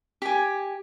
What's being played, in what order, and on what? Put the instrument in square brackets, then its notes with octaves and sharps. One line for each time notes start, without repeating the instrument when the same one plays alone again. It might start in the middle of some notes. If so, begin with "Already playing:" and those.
[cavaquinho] G4 G#5